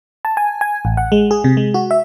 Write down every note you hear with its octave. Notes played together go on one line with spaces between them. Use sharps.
A5
G#5
G#5
A1
F#5
G#3
G#4
C3
G#3
F#4
E5